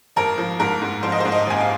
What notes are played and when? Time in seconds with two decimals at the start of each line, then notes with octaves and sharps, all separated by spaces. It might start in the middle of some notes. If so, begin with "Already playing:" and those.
0.16 G#1 A#4
0.38 F3
0.60 G#2 A#4
0.82 G#2
1.03 F3 C5
1.12 D#5
1.20 G#2 C5
1.32 D#5
1.47 G#1 G#5
1.61 F5